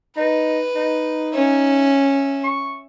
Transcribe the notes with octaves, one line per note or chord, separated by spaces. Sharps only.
D#4 B4
D#4
C#4 E5
C#6